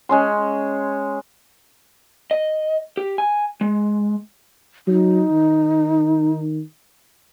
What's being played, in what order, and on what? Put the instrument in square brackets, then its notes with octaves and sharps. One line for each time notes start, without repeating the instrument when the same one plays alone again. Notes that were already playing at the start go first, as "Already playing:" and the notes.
[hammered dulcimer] G#3 C#4 C6
[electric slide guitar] D#5
G4
G#5
G#3
[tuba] F#3 [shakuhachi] D#4
[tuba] D#3